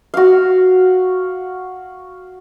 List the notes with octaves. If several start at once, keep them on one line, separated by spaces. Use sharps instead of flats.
F#4 F5